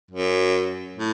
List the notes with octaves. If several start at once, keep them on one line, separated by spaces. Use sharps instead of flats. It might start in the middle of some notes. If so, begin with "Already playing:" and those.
F#2
A2